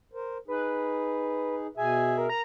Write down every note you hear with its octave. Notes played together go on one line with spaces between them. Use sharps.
A#4 C5
D#4 G#4 B4
B2 G#4 E5 G#5
A#4
A#4 A#5